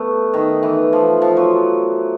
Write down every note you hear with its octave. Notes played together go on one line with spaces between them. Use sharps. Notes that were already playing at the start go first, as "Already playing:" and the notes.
Already playing: A3 B3
D#3
E3
F3
F3
F#3